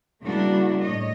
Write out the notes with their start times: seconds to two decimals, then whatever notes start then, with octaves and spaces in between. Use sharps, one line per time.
0.23 C#3 G3 A#3 D4 E4 F#4
0.82 A2 C#5 D#5